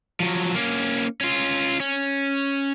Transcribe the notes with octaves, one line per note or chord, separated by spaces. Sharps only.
F3 F#3
A#3 C#4
C#4 F4
C#4